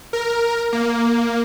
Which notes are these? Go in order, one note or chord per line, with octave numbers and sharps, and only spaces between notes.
A#4
A#3